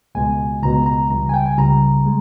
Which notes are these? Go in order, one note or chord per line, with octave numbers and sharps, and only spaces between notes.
C#2 B2 G#3 G#5
C#2 B2 G#3 A#5
A#5
C#2 C#3 G3 A#5
G#5
G5
G#5
C#2 C#3 G3 A#5
G#3